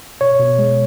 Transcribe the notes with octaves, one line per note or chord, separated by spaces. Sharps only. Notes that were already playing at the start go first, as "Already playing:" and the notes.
B2 C#5
B2
G#3